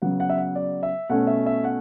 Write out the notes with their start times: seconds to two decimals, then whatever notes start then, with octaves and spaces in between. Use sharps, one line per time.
0.02 C#3 F#3 B3 F#5
0.20 F#5
0.30 E5
0.37 F#5
0.55 D5
0.83 E5
1.09 B2 A3 C#4 F#5
1.27 E5
1.46 E5
1.64 F#5